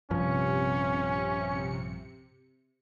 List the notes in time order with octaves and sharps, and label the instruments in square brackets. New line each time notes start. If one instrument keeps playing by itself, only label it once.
[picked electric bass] A#1 G2 F3 [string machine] C3 C#7 [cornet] C#4